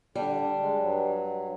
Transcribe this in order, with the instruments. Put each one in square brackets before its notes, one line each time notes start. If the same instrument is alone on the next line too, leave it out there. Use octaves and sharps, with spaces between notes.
[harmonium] D3 [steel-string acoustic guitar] G3 D4
[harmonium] G#3
G2 F#3